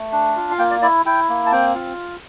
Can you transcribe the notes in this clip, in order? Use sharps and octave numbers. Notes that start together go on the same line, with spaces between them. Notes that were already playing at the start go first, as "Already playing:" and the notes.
Already playing: A3
D4
F4
F5
A#3 G5
D5
E4 D5
E4 G5
A#3
A5
C4 G5
F4